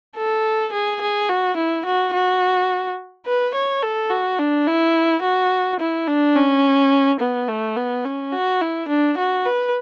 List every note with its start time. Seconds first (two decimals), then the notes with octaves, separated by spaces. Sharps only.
0.16 A4
0.73 G#4
1.01 G#4
1.29 F#4
1.57 E4
1.86 F#4
2.13 F#4
3.26 B4
3.54 C#5
3.83 A4
4.10 F#4
4.39 D4
4.67 E4
5.23 F#4
5.80 E4
6.07 D4
6.36 C#4
7.20 B3
7.48 A3
7.76 B3
8.05 C#4
8.33 F#4
8.61 E4
8.88 D4
9.18 F#4
9.46 B4